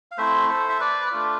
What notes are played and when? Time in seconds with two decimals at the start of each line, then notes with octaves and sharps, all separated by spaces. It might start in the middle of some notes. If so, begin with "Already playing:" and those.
0.11 F5
0.18 A3 C4 E4 C5 E5
0.49 A4 C5
0.69 E5
0.80 B4 D5
1.11 A3 D4 F4